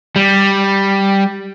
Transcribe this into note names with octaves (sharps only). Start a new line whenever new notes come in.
G3